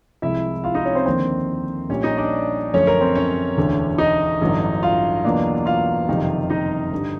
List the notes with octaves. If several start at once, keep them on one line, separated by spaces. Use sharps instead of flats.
C2 C3 F3 G#3 E4 E5
F4 F5
D#4 D#5
C#4 C#5
C4 C5
D#2 D3 F3 A#3 C4 C5
A#1 A#2 G3 C#4 C#5
D#4 D#5
D4 D5
F#2 D3 F3 A3 C#4 C#5
A#4
C4 C5
C#4 C#5
E1 D2 D3
D#4 D#5
A1 G2 D3 F#3
F4 F5
E2 B2 F#3 A#3 D4
F4 F5
F#1 F2 C3 D#3 G3
D#4 D#5
G2 D3 G3